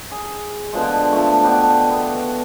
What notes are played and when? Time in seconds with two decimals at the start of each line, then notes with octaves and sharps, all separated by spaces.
0.11 G#4
0.73 B2 D3 F3 G#3
1.12 F3 A3
1.44 B2 B3 D4 G5
1.91 B3